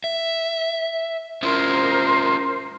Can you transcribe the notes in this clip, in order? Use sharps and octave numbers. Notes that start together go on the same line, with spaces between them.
E5
C#4 E4 F4 A#4 C5